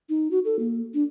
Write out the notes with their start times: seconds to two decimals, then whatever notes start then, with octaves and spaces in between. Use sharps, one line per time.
0.09 D#4
0.31 F#4
0.45 A4
0.59 A#3
0.94 D4